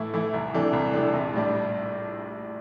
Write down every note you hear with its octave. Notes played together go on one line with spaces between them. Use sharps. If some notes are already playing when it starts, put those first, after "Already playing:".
Already playing: A2 E3 A3 E4
E3 A3 E4
C2
C3 E3 A3 D4
C2
C3 E3 A3 D4
A#1
A2 G3 D4